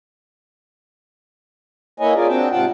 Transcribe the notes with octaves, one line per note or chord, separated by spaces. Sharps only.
A#3 E4 B4 C#5 D#5 G#5
C#4 F4 G#4 A#4 D5
C4 D4 F#4 G5 A5
G#2 C3 F4 F#5 G5 A5